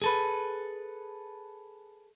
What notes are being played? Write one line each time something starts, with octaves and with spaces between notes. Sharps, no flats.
G#4 A4 B4